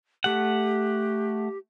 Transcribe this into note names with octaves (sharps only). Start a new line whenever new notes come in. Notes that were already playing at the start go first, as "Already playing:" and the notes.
A3 G4 F#5